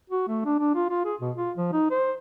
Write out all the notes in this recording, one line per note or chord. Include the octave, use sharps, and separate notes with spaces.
F#4
A3
D4
D4
F4
F4
G#4
B2
F4
F3
D#4
C5